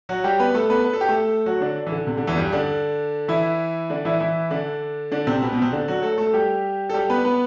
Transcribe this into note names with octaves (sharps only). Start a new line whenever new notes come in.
F#3 F#4
G3 G4
B3 B4
A3 A4
B3 B4
B4
A4
G4
A3 A4
F#3 F#4
D3 D4
E3
D3
C3
D3
E2 E3
G2 G3
D3 D4
E3 E4
D3 D4
E3 E4
E3 E4
D3 D4
D3 D4
C3 C4
B2 B3
B2 B3
C3 C4
D3 D4
F#3 F#4
A3 A4
A3 A4
G3 G4
A4
G3 G4
B3 B4
B3 B4